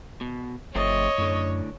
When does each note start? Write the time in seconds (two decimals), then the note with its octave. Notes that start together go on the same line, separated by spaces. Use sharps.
0.21 B2
0.75 G1 F3 A3 C4 C#5 D#5
1.18 F#2 A2 D3